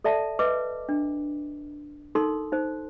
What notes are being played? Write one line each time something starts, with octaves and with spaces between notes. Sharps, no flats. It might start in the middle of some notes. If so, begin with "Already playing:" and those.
A4 D5 E5 A5
B4 D#5 D6
D4
D#4 A4 A#4 C6
D#4 C5